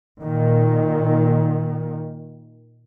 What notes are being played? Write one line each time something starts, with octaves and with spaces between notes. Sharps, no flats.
A#2 D#3